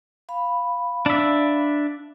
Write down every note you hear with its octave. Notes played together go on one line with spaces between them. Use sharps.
F5 B5
D4 E5